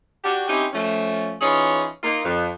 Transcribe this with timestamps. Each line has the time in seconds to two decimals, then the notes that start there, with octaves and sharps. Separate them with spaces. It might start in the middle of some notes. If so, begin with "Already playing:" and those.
0.24 D4 F#4 G4
0.48 C4 C#4 D#4 E4 G4
0.74 F3 A3 C#4
1.41 E3 C#4 D#4 F4 G#4 C#5
2.03 A#3 D#4 F4
2.24 F2